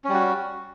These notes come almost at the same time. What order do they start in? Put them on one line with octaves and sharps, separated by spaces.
C#4 G3 F#4